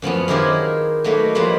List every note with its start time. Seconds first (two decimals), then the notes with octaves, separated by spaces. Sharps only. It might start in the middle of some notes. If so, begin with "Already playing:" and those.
0.02 F#2 F3 B3 C#4
0.28 D#3 E4 G4 G#4 A#4 C5
1.04 F#3 A3 A#3 D#4 B4 E5
1.35 F3 G3 G#3 A#3 B4 C5